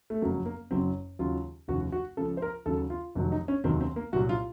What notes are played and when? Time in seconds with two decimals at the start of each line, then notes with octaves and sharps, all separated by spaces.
0.10 A3
0.22 F#1 F2 C#3 F#3 A#3
0.46 A#3
0.71 F#1 F#2 C#3 F#3 C4
1.19 D#2 C#3 F#3 F4
1.68 F1 D#2 C#3 F3 F#4
1.92 F#4
2.17 C#2 C#3 F3 A4
2.37 C5
2.42 A#4
2.66 D#2 C#3 F#3 A4
2.90 F4
3.15 F1 F2 D#3 F#3
3.32 D#4
3.48 C#4
3.64 F1 D#2 D#3 F#3 C4
3.81 C4
3.96 A#3
4.12 C2 A#2 F#3 F#4
4.29 F4